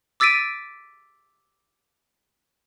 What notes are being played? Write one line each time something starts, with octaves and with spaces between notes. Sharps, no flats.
D6 E6 A6 B6 D7 D#7